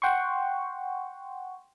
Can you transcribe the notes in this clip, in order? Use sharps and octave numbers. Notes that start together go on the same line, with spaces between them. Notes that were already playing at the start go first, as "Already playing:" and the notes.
F#5 G5 C6 C#6